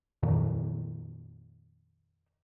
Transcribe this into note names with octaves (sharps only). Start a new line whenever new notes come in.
F2 A#2 D#3